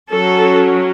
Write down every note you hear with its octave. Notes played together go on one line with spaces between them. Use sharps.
F#3 C#4 A4